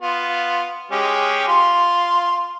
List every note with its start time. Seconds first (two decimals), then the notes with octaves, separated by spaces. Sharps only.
0.02 B3 F4
0.92 G#3 C#4 G4
1.48 F4 C6